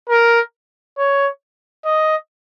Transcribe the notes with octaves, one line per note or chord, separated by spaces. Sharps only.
A#4
C#5
D#5